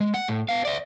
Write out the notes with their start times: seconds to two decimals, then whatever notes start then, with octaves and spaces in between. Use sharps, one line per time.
0.01 G#3
0.14 F#5
0.28 A2
0.49 B3 F5
0.65 D5 E5